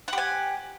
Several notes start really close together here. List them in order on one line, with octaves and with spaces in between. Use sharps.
F#5 G4 G#5